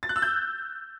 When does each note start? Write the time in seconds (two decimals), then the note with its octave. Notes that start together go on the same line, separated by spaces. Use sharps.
0.03 A6
0.09 F#6
0.16 E6
0.22 G6